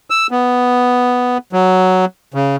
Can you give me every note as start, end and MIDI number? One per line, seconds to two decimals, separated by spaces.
0.10 0.27 88
0.31 1.38 59
1.53 2.05 54
2.34 2.56 49